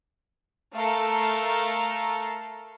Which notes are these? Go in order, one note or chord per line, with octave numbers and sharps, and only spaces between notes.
A3 A4 A#4 F5